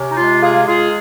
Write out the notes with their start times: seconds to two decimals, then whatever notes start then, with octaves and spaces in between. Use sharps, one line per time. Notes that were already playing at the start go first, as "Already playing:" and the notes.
Already playing: C3 C#4
0.12 D#4
0.17 G#3 F4
0.42 F4 G#4
0.55 G#3
0.67 F4 G#4